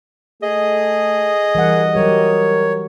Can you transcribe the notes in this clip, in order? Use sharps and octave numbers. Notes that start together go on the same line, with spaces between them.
A3 G#4 D#5
E3 G3 A#4 F#5
F#3 G3 G4 A#4 C#5